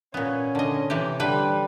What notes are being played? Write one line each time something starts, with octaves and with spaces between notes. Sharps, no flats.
A#2 B3 C#4
D3 D#5
C3 E3 G4
D3 G3 B4 G5